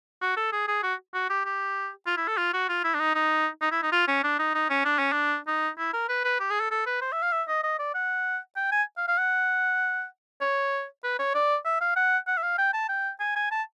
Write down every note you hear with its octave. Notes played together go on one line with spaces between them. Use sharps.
F#4
A4
G#4
G#4
F#4
F#4
G4
G4
F4
E4
A4
F4
F#4
F4
E4
D4
D#4
D#4
D#4
E4
D#4
F4
C#4
D4
D#4
D#4
C#4
D4
C#4
D4
D#4
E4
A#4
B4
B4
G4
G#4
A4
A4
B4
C5
E5
F5
E5
D#5
D#5
D5
F#5
G5
G#5
F5
F5
F#5
C#5
B4
C#5
D5
E5
F5
F#5
F#5
E5
F5
G5
A5
G5
G#5
G#5
A5